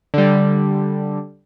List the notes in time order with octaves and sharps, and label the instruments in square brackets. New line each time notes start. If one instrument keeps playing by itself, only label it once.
[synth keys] D3 G3